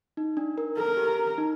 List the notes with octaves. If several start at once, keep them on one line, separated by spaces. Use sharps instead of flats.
D#4
D4
A#4
A4 A#4
G4
D#4